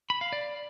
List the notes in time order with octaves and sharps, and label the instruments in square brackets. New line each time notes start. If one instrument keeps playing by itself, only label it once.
[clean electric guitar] B5
F5
D5